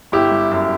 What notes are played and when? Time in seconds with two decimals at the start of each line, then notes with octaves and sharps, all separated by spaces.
0.12 G1 E4 G4
0.31 G3
0.51 F#2